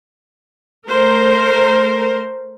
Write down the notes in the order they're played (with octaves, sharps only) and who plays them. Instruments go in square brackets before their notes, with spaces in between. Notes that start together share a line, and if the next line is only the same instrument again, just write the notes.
[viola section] A3 A#4 C5